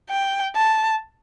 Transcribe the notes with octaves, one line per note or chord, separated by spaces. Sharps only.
G5
A5